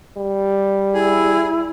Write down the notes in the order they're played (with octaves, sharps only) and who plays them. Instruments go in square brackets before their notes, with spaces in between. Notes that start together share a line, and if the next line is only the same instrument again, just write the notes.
[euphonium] G3
[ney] E4 [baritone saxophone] G#4